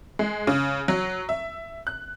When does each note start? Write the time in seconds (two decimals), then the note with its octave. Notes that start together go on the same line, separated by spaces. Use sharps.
0.19 G#3
0.47 C#3
0.88 F#3
1.29 E5
1.87 F#6